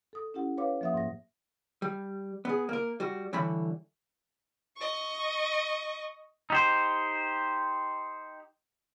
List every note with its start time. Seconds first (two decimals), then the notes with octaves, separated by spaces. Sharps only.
0.13 A4 D#6
0.34 C#4 E4 G4 F#5
0.58 B4 C#5 F5 D6
0.81 F3 A#3 E5 F#5 D#6
0.94 G#2 A#6
1.82 G3
2.45 B3 G#4
2.69 A#3 A#4
3.00 G3 F#4
3.33 D3 E3 G3 C#5 B5
4.77 D#5 C#6
6.50 D#4 G4 C5